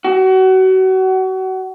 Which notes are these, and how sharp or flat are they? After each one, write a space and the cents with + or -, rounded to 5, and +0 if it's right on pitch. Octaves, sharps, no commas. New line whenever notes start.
F#4 +30